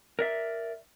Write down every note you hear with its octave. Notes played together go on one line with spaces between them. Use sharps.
A#4 D5 E5